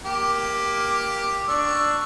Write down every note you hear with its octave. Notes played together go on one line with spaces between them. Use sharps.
A#3 G4
D4 C#6 E6